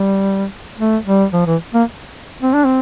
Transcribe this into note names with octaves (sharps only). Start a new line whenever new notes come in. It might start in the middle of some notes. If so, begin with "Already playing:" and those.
Already playing: G3
A3
G3
F3
E3
A#3
C4
D4
C4